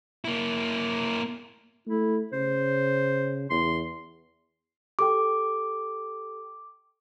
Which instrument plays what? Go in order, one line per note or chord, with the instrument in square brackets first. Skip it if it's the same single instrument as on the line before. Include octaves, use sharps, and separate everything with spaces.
[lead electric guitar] A#3 E4
[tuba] A3 [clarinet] E4
[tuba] C#3 [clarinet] C5
[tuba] E2 [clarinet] C6
[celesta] G4 A4 G5 [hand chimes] D6